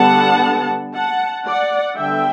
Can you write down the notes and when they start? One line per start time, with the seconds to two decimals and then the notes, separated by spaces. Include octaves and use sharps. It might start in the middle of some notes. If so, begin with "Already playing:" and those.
Already playing: D3 G3 B3 D4 F#5 A5
0.94 F#5 A5
1.46 D5 F#5
1.96 D3 G3 B3 E5 G5